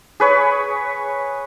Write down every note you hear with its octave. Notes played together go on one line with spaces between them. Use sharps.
G#4 B4 C#5